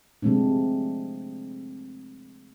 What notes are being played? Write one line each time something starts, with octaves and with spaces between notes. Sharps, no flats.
C3 F3 G#3 A3 C4 D4